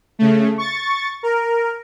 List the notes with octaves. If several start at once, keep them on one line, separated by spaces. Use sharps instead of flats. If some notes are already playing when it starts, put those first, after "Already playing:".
C#3 A3
C#6 A6
A#4